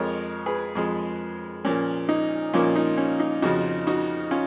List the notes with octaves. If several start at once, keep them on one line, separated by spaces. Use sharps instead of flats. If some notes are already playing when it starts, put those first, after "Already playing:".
Already playing: F2 F3 G#3 A#4 C#5
G#4 B4
F2 F3 G#3
A#2 F3 A#3 C#4
D#4
A#2 F3 A#3 C#4 F4
D#4
C#4
D#4
F2 C#3 F3 D#4 F#4
D#4 F#4
C#4 F4